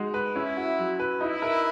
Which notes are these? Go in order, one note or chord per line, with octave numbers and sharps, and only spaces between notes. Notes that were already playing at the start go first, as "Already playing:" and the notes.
Already playing: G#3 D#4 F#4
B4
C#4 E4
F#4
F#3
B4
D#4 E4
A#4